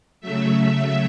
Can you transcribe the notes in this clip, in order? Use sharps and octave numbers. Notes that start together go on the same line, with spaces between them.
C#3 F#3 A3 E5
E5